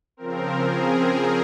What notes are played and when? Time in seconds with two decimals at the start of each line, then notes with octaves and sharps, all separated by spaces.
0.17 C#3 F3 C4 A#4
0.63 G#4